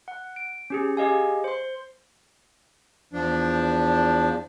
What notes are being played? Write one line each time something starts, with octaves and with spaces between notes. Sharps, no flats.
F#5
D7
C#4 G4 G#4
G4 G#4 D#5 F5 G#5
C5 C6
E2 F3 D4